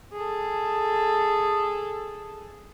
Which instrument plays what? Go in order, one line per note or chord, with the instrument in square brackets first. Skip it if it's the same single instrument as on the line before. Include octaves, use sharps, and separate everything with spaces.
[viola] G#4 A4